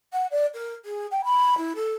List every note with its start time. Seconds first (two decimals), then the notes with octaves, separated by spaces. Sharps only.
0.13 F#5
0.31 D5
0.54 A#4
0.85 G#4
1.11 G5
1.24 B5
1.58 E4
1.76 A4